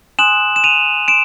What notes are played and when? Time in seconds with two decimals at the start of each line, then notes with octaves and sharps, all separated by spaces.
0.19 G#5 C6 D#6 F#6 E7 F#7
0.56 E7
0.64 D#7 F7
1.08 C6 D7 E7